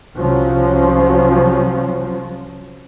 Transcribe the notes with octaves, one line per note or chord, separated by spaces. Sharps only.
C2 F3 F#3 C#4